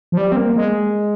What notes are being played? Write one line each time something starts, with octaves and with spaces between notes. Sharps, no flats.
F3
G3
C4
A#3
G#3